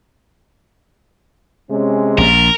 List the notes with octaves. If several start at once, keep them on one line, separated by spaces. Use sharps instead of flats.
C3 G#3 C#4
A#1 A#2 A#4